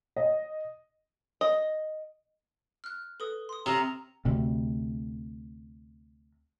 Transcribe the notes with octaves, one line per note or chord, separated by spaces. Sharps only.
D#5
D#5
F6 F#6
A4 B4 D#6
C6 D#6
C3 A#5 D#6 F6 D#7
D2 C3